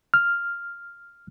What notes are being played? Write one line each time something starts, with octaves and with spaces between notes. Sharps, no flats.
F6